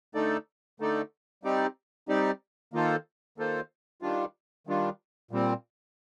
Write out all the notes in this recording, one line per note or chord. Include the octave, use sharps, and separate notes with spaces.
D3 A3 D#4 A4 D5
D3 A3 D#4 A4 D5
G3 C4 D#4 G4 D5
G3 C4 D#4 G4 D5
D#3 A#3 F4 A4 C5
D#3 A#3 F4 A4 C5
D#3 G3 D4 F4
D#3 G3 D4 F4
A#2 G3 C4